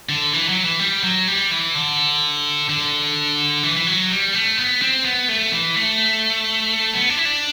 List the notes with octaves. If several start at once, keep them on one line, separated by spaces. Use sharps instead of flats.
D3
E3
F#3
E3
G3
F#3
G3
E3
D3
D3
E3
E3
F#3
G3
A3
B3
C4
B3
A3
E3
A3
B3
D4
E4
D4